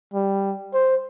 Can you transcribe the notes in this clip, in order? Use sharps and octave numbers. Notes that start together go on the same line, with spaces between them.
G3
C5